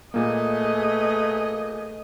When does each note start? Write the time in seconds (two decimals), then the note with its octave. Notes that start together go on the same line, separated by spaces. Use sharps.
0.14 A#2 A3 A#3 G#4 B4 D#5